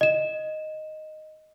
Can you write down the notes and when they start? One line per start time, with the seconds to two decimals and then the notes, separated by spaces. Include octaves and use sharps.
0.01 D#5 E7